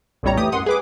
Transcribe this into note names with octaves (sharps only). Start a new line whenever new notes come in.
A#1 F2 A2 G3 C#5 A#5
E3 A3 G4 D#6
F#2 F#5 C6 D#6
G#4 B4 D6